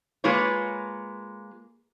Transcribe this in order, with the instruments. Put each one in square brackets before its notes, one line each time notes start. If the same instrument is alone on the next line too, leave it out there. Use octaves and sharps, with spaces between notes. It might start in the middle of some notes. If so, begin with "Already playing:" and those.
[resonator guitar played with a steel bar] G#3 A#3 F4 B4 C#5